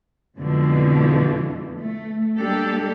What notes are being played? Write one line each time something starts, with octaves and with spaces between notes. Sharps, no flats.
F2 B2 D3 E3 F3 G#3
A3
G3 G#3 A#3 D4 G4 A4